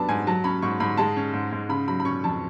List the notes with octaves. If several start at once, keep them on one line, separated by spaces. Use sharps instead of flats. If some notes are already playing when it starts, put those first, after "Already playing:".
Already playing: F#2 F#3 B3 D4 A5 B5
G#2 G#5
F#3 A5
C#4 B5
G#2 C#6
G#2 B5
G#3 A5
C#4
G#2
G#2
C#3 B5
F#3 B5
B5
C#4 C#6
F2 A5